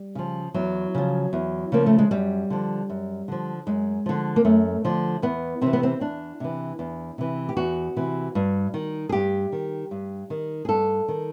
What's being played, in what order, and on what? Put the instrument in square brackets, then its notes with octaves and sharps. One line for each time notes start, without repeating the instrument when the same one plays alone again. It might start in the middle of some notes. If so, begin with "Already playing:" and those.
Already playing: [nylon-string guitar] G3
C#3 F3
E2 F#3
C#3 F3
E2
C#3 F3 A#3
A3
G#3
F#2 G3
D3 F3
F#2
D3 F3
F#2 G#3
D3 F3
A#3
F#2 A3
D3 F3
E2 B3
C3 E3 C4
B3
C4
E2 D4
C3 E3
E2
C3 E3
G4
E2 F#4
C3 E3
G2
D#3
G#4
G2 G4
D#3
G2
D#3
G#4
G2 A4
D#3